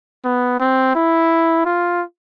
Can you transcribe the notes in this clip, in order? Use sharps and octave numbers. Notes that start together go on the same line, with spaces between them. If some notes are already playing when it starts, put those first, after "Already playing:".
B3
C4
E4
F4